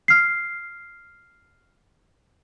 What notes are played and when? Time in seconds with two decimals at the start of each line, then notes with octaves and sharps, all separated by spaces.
0.08 F6 C7